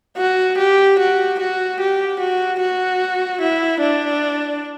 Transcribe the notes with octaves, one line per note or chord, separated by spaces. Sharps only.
F#4
G4
F#4
F#4
G4
F#4
F#4
E4
D4